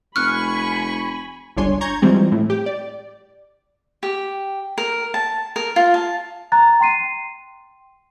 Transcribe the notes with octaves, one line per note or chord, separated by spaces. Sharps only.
F1 G#5 B5 C#6 F6 F#6
G1 C#2 D4 C#5 G#5 C6
A#5 C#6 G6 G#6
E3 F3 G3 G#3 C4
A2
G4
D5
G4
A#4
A5
A#4
F4
A5
A#5 F#6 A6
G5 C6 C7 D#7